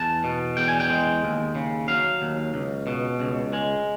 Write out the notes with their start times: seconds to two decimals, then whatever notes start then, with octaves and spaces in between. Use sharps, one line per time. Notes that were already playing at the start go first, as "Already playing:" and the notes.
Already playing: E2 A5
0.24 B2
0.57 E2 G5
0.68 G#5
0.80 G5
0.90 G#3
1.23 D#2
1.55 C#3
1.88 F#3 F5
2.22 D#2
2.54 C#2
2.87 B2
3.20 C#2
3.53 G#3